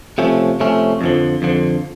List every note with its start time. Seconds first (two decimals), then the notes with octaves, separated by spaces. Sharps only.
0.18 C3 F3 A3 C#4
0.60 C3 F3 A3 C#4
1.01 F2 D3 F3
1.42 F2 D3 F3